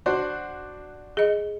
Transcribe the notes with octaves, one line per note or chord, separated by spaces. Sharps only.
D4 F#4 C5
G#4 D#5